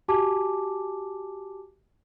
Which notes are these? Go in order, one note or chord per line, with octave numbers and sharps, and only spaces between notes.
F#4 G4 G#5 A5 D6